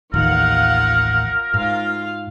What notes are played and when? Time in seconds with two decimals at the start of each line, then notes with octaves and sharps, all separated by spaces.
0.14 A1 D#2 D#3 F4 A#4 F5 F#5
1.54 G#2 F4 F5